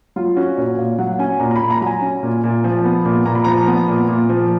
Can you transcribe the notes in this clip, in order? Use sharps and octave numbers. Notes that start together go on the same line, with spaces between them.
F#3 F4
C#4 F#4
A#2 C#5
A#2 F5
F#3 F#5
F#5
C#4 G#5
A#2 A#5
A#5
B5
A#2
A#5
F#3 A#5
G#5
C#4
A#2
A#2
F3
B3
A#2
A#2 A#5
B5
F3 A#5
B3
A#2
A#2
F3